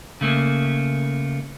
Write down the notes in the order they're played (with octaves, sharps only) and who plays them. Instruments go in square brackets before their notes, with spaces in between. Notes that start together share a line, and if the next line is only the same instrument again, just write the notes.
[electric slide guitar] C#3 A3 A#3